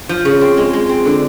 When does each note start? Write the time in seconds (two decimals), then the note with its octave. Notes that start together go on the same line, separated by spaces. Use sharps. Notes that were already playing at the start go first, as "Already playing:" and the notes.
0.09 F3
0.25 C#3
0.41 C4
0.57 G#3
0.73 G#3
0.89 C4
1.05 D3